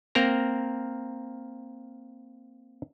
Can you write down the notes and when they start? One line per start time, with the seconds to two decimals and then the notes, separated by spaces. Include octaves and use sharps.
0.15 A#3 C4 A#4 A#5